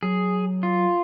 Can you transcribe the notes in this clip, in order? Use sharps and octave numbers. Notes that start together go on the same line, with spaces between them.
F#3 G#4
F4